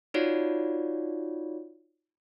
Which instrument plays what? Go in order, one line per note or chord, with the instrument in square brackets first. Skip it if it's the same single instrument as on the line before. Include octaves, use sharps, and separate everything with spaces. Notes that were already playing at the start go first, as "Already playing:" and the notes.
[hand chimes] D#4 F4 F#4 C#5 D5